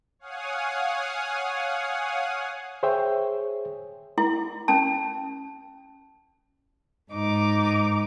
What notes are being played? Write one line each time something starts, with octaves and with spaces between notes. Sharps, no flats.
C#5 F5 F#5 G#5 D#6
G#4 C5 C#5 E5 G5
E4
C#4 A5
G#2 D#4 D6